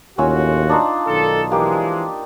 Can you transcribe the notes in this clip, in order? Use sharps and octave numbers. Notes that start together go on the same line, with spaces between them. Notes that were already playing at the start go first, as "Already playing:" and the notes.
D#2 A2 C#4 F4 F#4 E6
D4 D#4 C5
B1 D#3 A4
E3 F3 G#3 A#3 G4